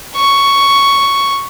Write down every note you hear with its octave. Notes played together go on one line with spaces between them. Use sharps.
C#6